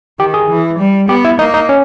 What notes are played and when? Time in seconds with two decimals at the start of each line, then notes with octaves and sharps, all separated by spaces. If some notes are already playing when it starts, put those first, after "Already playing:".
0.19 D#3 G4
0.34 G#4
0.50 E3
0.79 G3
1.09 B3 G4
1.25 E4
1.39 A#3 D#4
1.54 D#4
1.69 C#4